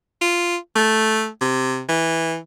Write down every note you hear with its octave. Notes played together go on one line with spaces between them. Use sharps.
F4
A3
C3
E3